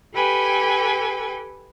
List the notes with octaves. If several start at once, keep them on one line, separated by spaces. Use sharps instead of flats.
G4 A4 B4 G5 G#5